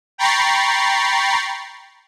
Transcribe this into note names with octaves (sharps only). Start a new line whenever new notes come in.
G5 A#5 B5 C#6 A6 C7